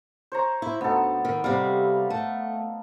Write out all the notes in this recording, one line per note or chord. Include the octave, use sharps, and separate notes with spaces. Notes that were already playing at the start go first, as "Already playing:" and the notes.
C5 C#5 A#5
E4
D2 B3 D#4 A4
D#3
C3 G3 F5
A3